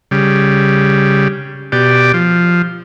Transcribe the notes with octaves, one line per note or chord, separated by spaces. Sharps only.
C#3 G3
B2 G4 D5
F3